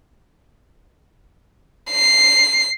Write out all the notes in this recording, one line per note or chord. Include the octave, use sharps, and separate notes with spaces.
C7